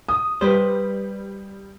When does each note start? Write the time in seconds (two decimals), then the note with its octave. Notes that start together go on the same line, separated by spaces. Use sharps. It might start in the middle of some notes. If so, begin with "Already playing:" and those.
0.09 D#6
0.41 G3 G4 B4 C5